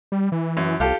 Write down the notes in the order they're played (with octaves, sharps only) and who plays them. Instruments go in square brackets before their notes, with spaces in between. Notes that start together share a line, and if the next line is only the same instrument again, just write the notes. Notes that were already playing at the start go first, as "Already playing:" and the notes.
[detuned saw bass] G3
E3
[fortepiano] F#2
[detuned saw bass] C2 [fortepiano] F4 G4 A4